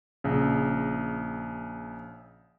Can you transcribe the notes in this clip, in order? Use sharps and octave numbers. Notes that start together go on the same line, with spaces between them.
A#1 C#3